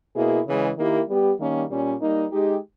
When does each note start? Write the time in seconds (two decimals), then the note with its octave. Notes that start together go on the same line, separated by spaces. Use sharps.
0.15 B2 A#3 E4 G#4
0.46 C#3 E3 G#3
0.77 D#3 A#3 E4 G4
1.08 G3 B3 G4
1.39 D#3 G3 A#3 C#4
1.69 A#2 G3 C#4
2.01 G3 A#3 D#4
2.31 G#3 D#4 G4